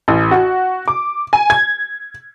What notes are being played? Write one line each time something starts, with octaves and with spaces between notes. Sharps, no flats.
A1
F#4
D6
G#5
G#6